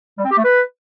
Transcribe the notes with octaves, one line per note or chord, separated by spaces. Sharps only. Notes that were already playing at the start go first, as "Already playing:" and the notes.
G3
C4
G4
A3
B4